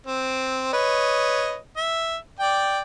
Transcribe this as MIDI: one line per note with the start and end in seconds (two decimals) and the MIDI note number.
0.07 0.71 60
0.73 1.56 71
0.73 1.56 73
0.73 1.56 75
1.77 2.16 76
2.39 2.80 74
2.39 2.80 79